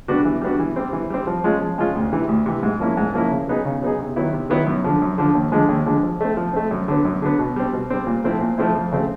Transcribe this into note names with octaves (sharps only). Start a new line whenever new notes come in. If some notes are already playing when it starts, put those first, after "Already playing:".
G3 B3 D4 F#4
E3
G3 B3 D4 F#4
E3
G3 C4
E3
G3 C4
F3
G#3 C#4 F4
F3
G#3 C#4 F4
D2
C3 E3
D2
C3 E3
G#2
F3 A#3 C#4 E4
G#2
F3 A#3 C#4 E4
C#3
F#3 B3 D#4 G#4
C#3
F#3 B3 D#4 G#4
C3
D#3 F#3 B3 E4
C3
D#3 F#3 B3 E4
F#2
D3 F3
F#2
D3 F3
D#2
D3 F3 G#3
D#2
D3 F3 G#3
F3
A3 C4
F3
A3 C4
F#2
D3 F#3 B3
F#2
D3 F#3 B3
B2
G3 C4
B2
G3 C4
A#2
F3 A3 C4 E4
A#2
F3 A3 C4 E4
F2
C#3 F#3 A3 C4